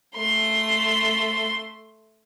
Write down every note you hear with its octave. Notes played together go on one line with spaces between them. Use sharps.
A3 C6